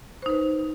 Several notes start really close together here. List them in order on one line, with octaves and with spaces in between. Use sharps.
C5 D#4 B4